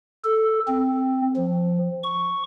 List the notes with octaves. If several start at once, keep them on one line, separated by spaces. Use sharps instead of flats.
A4
C4
F3
C#6